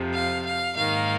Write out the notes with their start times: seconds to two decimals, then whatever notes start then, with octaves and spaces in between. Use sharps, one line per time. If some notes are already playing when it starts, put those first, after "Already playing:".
Already playing: F2 C3 F3
0.14 F5
0.45 F5
0.76 G#2 D#3 A#3 F5